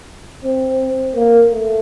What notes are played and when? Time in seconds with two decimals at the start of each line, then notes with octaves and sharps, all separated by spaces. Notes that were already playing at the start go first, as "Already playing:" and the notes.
0.44 C4
1.15 A#3
1.51 A3